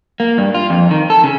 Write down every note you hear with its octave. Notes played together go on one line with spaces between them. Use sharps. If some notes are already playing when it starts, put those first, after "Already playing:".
A#3
G2
F4
F2
D#3
A4
C#3